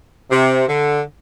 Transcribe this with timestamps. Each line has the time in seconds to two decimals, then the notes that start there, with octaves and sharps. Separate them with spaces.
0.31 C3
0.68 D3